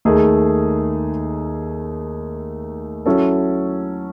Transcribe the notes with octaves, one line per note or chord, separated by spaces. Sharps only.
D#2 D#3 A3 D#4 G#4
F#3 C#4 E4 A4